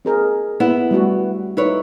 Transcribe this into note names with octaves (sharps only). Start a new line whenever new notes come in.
C4 G#4 A#4
B3 E4
G3 A3 F#4
D#4 E4 B4 C#5